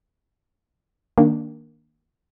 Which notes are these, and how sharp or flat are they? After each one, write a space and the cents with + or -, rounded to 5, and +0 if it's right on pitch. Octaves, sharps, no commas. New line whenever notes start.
D#3 +0 A#3 +0 D4 +0